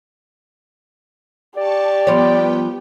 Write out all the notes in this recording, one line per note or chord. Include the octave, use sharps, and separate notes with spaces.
G4 D5 A5 C#6
F3 G3 B3 C#5 G5